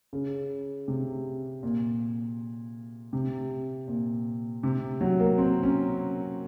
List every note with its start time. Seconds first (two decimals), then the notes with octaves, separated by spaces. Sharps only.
0.13 C#3
0.88 C3
1.63 A#2
3.13 C3
3.88 A#2
4.63 C3
5.01 F#3
5.20 A#3
5.38 C4
5.63 C#4